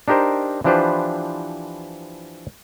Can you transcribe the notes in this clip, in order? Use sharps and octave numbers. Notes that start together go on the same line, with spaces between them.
D4 D#4 G4 A#4 C5
E3 F3 D4 G4 B4 C5